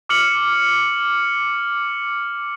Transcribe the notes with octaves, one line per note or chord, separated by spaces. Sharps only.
D6 F6 C#7 F#7